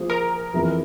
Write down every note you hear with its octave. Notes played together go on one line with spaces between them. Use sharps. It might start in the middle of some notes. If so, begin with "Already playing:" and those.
Already playing: F3 A#3 F4 G#4 C5
A#4
F2 E3 A#3 E4 G#4